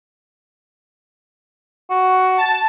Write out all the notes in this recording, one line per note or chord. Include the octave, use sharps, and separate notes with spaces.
F#4
A5